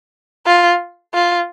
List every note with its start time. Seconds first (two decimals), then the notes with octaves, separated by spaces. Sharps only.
0.46 F4
1.14 F4